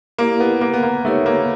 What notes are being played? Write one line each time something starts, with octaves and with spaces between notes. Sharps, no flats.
A#3 E4 G4 A#4 D5
B3
A#3
B3
A#3
A3 D#4 G4 A#4 C#5
A#3